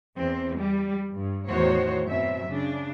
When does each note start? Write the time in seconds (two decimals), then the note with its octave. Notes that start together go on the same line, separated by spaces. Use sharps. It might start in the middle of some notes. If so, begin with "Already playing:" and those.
0.16 E2 C4
0.56 G3
1.14 G2
1.48 E2 A2 D#3 F#4 C5 C#5
2.06 F#2 B2 C4 E5
2.46 C#3 D4